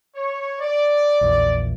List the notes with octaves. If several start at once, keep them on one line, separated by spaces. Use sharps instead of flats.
C#5
D5
A#1 E2